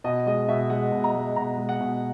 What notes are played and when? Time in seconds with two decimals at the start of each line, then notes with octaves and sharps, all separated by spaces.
0.04 B2 D#5
0.26 G#3 D#5
0.48 B2 E5
0.70 G#3 F#5
0.92 B2
1.04 A#5
1.14 G#3
1.36 B2 A#5
1.58 G#3
1.69 F#5
1.80 B2